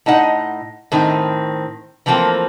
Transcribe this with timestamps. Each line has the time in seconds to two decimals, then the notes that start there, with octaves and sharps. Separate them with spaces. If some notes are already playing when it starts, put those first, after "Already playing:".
0.06 A2 D#4 D#5 F#5
0.92 A2 D#3 C4
2.06 E3 F3 A3 A#3 C4